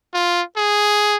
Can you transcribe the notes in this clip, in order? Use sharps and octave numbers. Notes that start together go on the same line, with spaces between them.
F4
G#4